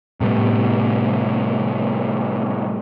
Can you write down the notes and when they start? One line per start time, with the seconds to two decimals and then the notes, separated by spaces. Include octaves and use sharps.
0.20 A2 C3 G3 B3